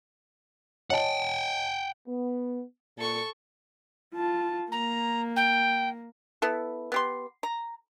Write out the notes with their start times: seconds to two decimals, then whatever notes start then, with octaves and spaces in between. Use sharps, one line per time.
0.90 C#5 D#5 F#5 G5 A5
2.08 B3
2.98 A#2 A4 C#6
4.15 F4 A5
4.71 A#3 A#5
5.36 G5
6.42 B3 E4 A4
6.92 B3 G4 C6
7.43 A#5